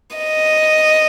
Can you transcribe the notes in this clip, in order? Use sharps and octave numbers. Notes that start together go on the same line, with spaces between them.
D#5